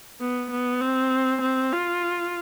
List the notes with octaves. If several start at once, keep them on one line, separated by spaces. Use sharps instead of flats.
B3
B3
C4
C4
F4